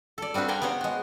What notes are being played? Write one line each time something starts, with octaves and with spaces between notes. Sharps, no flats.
A4 D5
G3 C4 D4 F#4 B4
D5 F5 G5 G#5 A#5 C6
B3 G4 C5 C#5 A#5
G#3 F#4